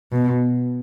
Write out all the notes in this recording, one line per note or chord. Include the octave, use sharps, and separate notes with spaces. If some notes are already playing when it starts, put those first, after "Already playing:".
B2